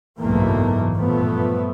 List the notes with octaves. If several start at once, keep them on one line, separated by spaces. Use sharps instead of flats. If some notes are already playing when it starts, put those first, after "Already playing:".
F#1 B1 E2 G#2 A3 A#3
G2 A#2 F3 A3 B3